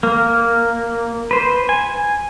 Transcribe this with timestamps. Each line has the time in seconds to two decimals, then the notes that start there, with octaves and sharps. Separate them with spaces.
0.03 A#3
1.31 B4 C5
1.69 G#5